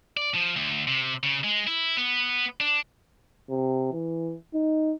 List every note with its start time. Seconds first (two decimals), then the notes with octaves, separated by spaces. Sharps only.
0.17 D5
0.35 F3
0.56 D2
0.87 C3
1.23 C#3
1.44 G#3
1.67 E4
1.97 B3
2.60 D4
3.50 C3
3.93 E3
4.54 D#4